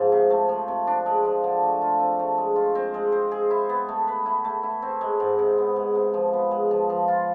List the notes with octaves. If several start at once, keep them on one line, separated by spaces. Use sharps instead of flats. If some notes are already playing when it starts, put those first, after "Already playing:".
Already playing: G#2 F3
C3
A3
F3
C3
D4
G#3
F3
D3
A3
F4
C4
A3
G#3
F4
C4
G#3
C5
G#4
E4
B3
A3
B4
E4
A3
E4
C4
G#3
G#2
C3
B3
G#3
C3
F3
B3
G#3
F3
F3
F4